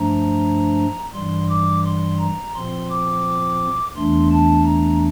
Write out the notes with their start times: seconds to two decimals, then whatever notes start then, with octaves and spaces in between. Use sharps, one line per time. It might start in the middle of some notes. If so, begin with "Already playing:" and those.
Already playing: G2 F3 A3 D4 A#5
1.13 G2 E3 G3 C6
1.49 D6
1.84 C6
2.19 A#5
2.54 A#2 F3 C4 C6
2.89 D6
3.95 E2 E3 A3 D4 C6
4.30 A5
4.65 A#5